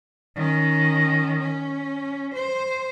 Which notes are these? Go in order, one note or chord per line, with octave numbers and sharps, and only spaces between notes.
D#3 C#4
C#4
C5